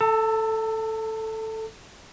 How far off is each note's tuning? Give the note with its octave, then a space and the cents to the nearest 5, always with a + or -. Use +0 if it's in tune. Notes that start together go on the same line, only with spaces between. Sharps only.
A4 +0 A5 +40